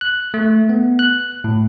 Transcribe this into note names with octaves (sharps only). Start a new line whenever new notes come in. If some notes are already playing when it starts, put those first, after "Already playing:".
F#6
A3
B3
F#6
A2